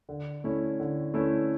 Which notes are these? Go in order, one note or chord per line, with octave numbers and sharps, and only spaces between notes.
D3
A3 C#4 E4
D3
A3 C#4 E4